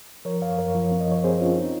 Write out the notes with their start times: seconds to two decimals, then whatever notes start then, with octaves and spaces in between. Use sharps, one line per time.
0.25 F3 A#4 C#5
0.41 F#2 C#5 F5
0.58 F#2 A#4 C#5
0.75 F3
0.91 C4
1.00 D#5
1.07 F3 C#5
1.24 C4 G#4 C5
1.41 C4 C#4 F4
1.57 D#4